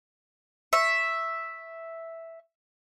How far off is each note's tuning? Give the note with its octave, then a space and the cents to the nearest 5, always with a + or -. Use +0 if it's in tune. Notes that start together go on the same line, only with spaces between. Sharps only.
E5 +0 C#6 -15